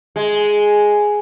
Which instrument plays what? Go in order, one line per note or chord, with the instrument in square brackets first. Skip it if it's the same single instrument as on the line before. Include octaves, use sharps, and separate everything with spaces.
[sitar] G#3